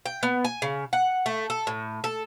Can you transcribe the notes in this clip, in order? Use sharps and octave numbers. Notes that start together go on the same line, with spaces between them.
G5
B3
G#5
C#3
F#5
A3
A4
A2
A4